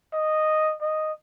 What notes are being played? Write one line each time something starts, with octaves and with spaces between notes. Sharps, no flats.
D#5
D#5